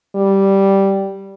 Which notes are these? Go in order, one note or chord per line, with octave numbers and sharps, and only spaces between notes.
G3